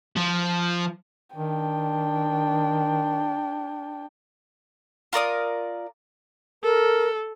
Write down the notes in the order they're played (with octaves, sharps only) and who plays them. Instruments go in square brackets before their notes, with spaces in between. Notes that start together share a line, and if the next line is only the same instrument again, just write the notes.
[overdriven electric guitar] F3
[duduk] D#3 [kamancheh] D4 G5
[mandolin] F4 A#4 D5 D#6
[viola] A4 [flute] A#4